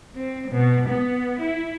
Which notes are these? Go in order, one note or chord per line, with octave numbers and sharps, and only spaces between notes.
C4
B2
B3
E4